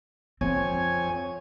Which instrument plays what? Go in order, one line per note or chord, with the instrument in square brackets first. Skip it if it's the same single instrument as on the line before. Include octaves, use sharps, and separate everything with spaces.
[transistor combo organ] F2 C#5 G#5 [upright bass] C4